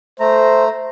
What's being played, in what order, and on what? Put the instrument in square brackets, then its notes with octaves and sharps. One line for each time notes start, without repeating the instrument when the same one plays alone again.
[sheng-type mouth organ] A3 A#5 [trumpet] C5